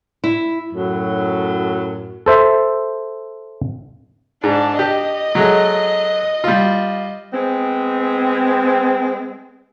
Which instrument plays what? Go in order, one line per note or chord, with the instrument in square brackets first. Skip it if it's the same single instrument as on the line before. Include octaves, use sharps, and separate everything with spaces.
[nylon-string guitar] E4
[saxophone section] F#2 A2 F#3
[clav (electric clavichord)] A4 C5 E5
[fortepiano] G#2 [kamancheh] D4 A5
[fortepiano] G4 [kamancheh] D#5
[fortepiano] F#3 G#3 A3
G3 F4
[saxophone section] G#3 B3 C4